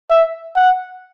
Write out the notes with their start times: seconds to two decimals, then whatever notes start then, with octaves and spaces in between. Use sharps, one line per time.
0.10 E5
0.56 F#5